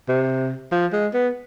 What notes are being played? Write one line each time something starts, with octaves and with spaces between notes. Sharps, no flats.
C3
F3
G#3
B3